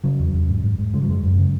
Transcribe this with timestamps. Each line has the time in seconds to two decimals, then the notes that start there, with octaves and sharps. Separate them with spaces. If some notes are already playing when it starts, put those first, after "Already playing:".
0.04 C#3 F#3
0.19 E2
0.34 E2
0.49 G#2
0.64 G#2
0.79 G#2
0.94 C#3 G#3
1.02 F#3
1.09 F#2 G#3
1.23 F#2
1.38 C#3